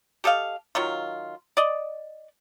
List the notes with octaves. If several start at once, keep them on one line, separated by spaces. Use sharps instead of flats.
G4 A4 D#5 F5
D#3 F#3 F4
D5 D#5